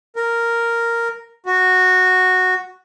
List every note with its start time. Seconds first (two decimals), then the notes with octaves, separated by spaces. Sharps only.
0.16 A#4
1.46 F#4